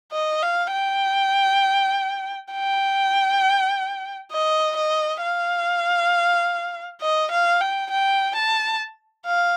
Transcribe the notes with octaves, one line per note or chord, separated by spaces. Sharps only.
D#5
F5
G5
G5
D#5
D#5
F5
D#5
F5
G5
G5
A5
F5